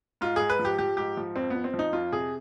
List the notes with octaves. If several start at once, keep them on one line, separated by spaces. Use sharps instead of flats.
G#2 F4
G#2 G#4
B4
F3
G4
F3 G4
G#2 G4
F3
F2 C4
F2 B3
C4
F3
D#4
F2 F4
C3 G#4